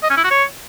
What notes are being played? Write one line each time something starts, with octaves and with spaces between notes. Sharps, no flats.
D#5
C#4
E4
F#4
C#5